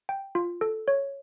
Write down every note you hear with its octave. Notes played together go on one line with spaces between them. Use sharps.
G5
F4
A4
C#5